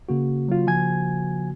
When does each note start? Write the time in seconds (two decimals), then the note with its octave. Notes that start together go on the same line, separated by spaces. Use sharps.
0.09 C#3 A#3 F#4
0.48 F#3 F4
0.67 F3 G#5 G#6